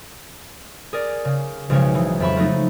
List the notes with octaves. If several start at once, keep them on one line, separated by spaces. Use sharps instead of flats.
G#4 A#4 D5
C#3
B1 C#3 F3 G#3 C#5
E3
F2 E5 B5 C#6
F3 F#3 A3 D#4